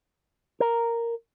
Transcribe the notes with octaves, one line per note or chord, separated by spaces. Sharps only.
A#4